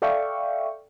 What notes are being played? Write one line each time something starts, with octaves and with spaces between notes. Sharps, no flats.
A4 D5 E5 F5 G5 C#6